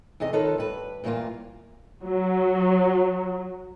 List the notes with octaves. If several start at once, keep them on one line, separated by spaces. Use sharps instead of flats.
E2 C3 G#4 D#5
D#3 D#4 F4 A4 B4 C#5
G2 B4
G2 A#2 E3 G3 A#3 F4
F#3 F#4